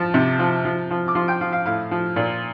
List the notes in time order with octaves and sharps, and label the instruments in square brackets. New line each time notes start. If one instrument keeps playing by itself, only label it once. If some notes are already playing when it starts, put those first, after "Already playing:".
Already playing: [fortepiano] F3 A5
C3
F3
F3
F3
D6
F3 C6
G5
F3 F5
F5
A2 F5
F3
A#2